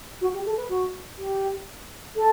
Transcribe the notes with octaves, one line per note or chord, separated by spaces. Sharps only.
F#4
G4
A4
B4
F#4
G4
A4